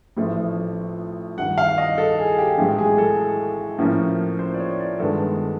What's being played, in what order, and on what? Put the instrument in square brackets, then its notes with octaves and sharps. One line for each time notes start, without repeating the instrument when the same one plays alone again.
[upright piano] A1 A2 F3 A3
[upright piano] G2 D#3 G3 [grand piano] F#5
[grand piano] F5
D#5
A4
G#4
G4
[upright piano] B1 A2 E3 G#3 [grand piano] G4
[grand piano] G#4
A4
[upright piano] A2 F3 A#3 C#4
[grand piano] C5
D5
C#5
D5
[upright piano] G2 D#3 G#3 B3 D4 [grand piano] A4